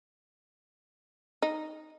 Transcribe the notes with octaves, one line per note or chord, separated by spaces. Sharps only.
D#4